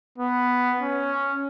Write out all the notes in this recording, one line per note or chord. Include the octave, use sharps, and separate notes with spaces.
B3
C#4